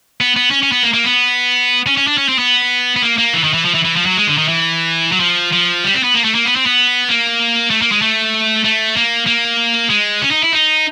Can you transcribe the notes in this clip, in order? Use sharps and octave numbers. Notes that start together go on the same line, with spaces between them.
B3
B3
C#4
C#4
B3
A#3
A#3
B3
C#4
C#4
D4
C#4
C4
B3
B3
A#3
A#3
E3
D#3
E3
F3
E3
E3
F3
F#3
G#3
D3
D#3
E3
F#3
F3
F3
G3
C4
B3
A#3
A3
A#3
B3
C4
B3
A#3
A3
A#3
G#3
A3
A3
A#3
A#3
G#3
C#4
D#4
E4
D#4